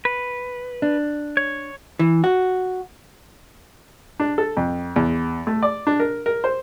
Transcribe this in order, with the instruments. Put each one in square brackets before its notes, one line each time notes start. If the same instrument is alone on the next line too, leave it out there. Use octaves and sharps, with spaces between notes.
[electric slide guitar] B4
[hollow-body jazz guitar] D4
[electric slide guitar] C#5
[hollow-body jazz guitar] E3
F#4
[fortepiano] D4
A4
F2
E2
A3
D5
D4
A#4
A#4
C5